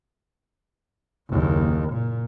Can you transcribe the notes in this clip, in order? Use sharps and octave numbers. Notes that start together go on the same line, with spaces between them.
F#1 D#2
A#2